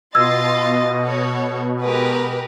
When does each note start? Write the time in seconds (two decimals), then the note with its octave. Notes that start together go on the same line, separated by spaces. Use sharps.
0.15 B2 F4 D#5 C6 E6 G#6 A6
0.99 F#4 A4 C#5
1.84 G#3 G4 A#4 B4